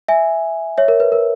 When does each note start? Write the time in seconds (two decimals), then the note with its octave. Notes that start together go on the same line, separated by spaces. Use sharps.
0.08 E5 G#5
0.78 C#5 E5
0.88 A#4
1.00 B4
1.12 A#4